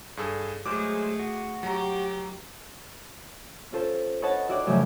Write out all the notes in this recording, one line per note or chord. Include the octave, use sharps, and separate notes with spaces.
G2 G#4 A4
F#3 G#3 A3 G#4 C5 D6
F#4
F#3 G4 A#5
C#4 F4 A4 C5
B4 C#5 D#5 F#5 A5
E4 F#4 C#5 D5 F#5 G5
F#2 A2 C#3 F3